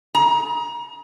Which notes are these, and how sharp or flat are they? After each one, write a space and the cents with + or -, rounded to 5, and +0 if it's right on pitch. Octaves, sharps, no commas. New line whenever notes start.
A#5 +30